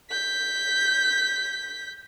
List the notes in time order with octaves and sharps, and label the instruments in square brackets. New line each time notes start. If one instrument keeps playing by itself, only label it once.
[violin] G6 B6